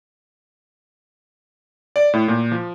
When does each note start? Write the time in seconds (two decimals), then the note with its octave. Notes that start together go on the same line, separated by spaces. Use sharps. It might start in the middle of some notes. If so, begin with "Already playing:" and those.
1.96 D5
2.13 A2
2.28 A#2
2.52 F3